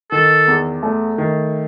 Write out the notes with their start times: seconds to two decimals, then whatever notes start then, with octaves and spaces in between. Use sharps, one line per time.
0.11 D#3 A4
0.47 E2
0.83 A3
1.18 D#3